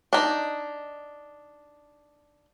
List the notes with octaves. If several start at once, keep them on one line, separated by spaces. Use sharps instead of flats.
D4 D#4